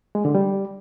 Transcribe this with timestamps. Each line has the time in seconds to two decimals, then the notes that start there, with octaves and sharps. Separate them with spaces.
0.15 G#3
0.25 D3
0.35 G3